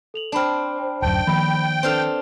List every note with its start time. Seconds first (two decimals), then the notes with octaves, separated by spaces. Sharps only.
0.14 A4 F7 F#7
0.32 C4 D4 A5 B5 F6
1.02 D1 F#2 C5 G5 A5
1.27 D#3 F3 A#3 B5
1.83 C4 D4 A4 B4 F6 F7